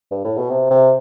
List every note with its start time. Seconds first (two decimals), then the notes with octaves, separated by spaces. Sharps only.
0.11 G2
0.25 A2
0.37 B2
0.50 C3
0.70 C3